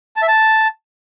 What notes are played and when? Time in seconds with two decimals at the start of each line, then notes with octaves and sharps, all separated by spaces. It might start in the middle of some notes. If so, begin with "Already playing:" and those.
0.16 A5
0.22 E5
0.28 A5